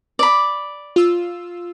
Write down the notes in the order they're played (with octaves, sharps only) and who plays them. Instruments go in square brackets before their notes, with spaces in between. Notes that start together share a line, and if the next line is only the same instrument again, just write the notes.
[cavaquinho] D5 B5
[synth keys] F4 E6